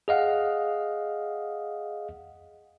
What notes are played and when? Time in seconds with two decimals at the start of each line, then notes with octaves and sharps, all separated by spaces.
0.08 G#4 D#5 F5 F#5